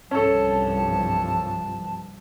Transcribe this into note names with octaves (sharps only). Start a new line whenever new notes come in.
C2 G2 F3 C#4 A4 A5